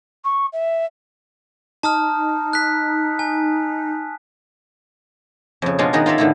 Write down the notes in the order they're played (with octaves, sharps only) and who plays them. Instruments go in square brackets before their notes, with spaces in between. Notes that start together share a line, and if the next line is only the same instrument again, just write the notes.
[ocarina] C#6
E5
[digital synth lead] D#4 [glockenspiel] A5 D#6 F6
[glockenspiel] F#6 B6
G#5
[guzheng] F2 C#3
B2 G#3 C#4 D4 F4
D#3 B3 F#4 G#4 A#4
F4 A#4 C#5 D5 E5
A2 D3 D#3 A3 B3 E4